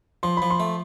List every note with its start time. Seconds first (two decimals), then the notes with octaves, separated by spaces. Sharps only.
0.23 F3 C6
0.37 F3 B5
0.50 C6
0.60 A3